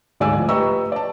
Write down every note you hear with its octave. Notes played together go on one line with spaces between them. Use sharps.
D2 G#2 D5 F5 G#5 E6
A2 F3
G4 B4 D#5 A#5 C#6 E6
D5 A5